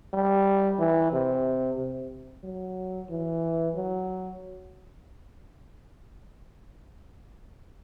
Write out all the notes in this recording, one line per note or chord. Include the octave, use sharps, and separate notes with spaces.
G3
E3
C3
C3
F#3
E3
F#3